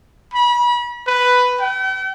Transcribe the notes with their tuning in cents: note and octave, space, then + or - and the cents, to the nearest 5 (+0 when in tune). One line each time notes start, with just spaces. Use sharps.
B5 -35
B4 +5
G5 -45